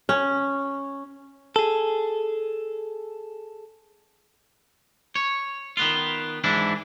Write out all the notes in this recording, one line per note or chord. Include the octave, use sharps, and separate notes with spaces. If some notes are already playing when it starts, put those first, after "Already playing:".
C#4
G#4 A4
C#5
D#3 B3 F4
G#2 E3 D4 E4